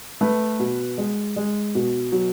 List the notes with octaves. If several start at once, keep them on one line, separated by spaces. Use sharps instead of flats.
A3 B4
B2
G#3
G#3
B2
F#3